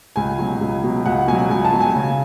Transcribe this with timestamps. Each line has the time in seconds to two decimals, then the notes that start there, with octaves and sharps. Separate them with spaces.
0.16 C#2 G#5
0.39 B2 F#3
0.61 C#2
0.84 B2 F#3
1.06 C#2 F#5
1.28 B2 G#5
1.33 F#3
1.50 C#2 G#5
1.65 A5
1.72 B2 F#3
1.80 G#5
1.95 C#3